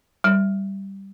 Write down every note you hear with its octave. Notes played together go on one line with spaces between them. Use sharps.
G3